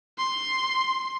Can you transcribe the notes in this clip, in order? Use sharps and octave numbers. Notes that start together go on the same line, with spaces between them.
C6